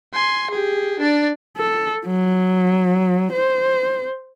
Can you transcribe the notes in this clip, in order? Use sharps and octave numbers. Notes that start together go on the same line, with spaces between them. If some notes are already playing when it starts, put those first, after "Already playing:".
G#5 C6
G4 G#4
D4 D5
A4
F#3
C5